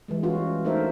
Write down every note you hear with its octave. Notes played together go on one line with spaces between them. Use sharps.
E3 G3 G#3
C#4 F4 F#4
A3 D4 D#4 A#4 C5 E5